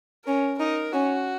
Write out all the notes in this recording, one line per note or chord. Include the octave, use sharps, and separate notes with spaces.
C#4 A#4
D#4 A#4
C#4 F#4